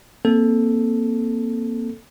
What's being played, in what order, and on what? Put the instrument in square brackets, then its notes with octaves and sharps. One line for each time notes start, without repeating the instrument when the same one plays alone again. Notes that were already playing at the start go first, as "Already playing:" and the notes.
[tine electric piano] A#3 C4 A4